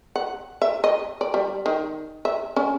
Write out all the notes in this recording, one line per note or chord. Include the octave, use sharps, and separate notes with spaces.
F#5
E5
D#5
D5
G3
D#3
E5
C#4